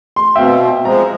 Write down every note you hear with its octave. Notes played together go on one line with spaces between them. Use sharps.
C6
B2 C4 E5 F5 G5
F3 G#3 A#5